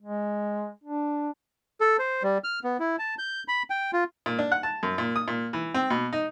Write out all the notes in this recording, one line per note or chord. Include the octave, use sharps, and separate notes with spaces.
G#3
D4
A4
C5
G3
F6
B3
E4
A5
G6
B5
G5
F4
A#2
D4
F#5
A5
F#2
A#2
D#6
A#2
E3
C4
B2
D#4